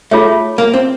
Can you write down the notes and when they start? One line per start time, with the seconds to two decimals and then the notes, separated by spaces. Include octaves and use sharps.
0.11 A3 F4 G#4 C#5 E5
0.58 A#3
0.74 C4